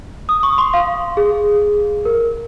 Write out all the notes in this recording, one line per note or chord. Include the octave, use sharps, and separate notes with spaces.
D#6
C#6
C6
F5
G#4
A#4